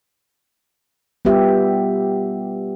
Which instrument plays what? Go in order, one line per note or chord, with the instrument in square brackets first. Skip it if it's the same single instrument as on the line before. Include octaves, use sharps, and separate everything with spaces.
[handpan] G3 B3 F4 G4 E5